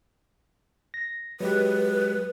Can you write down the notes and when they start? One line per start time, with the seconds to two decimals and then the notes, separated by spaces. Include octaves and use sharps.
0.94 A#6
1.40 F#3 G#3 G4 B4